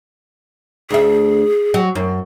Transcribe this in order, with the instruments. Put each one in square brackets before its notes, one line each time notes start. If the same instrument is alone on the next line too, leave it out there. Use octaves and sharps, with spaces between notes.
[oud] D2 E5 [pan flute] G#4
[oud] F#3
F#2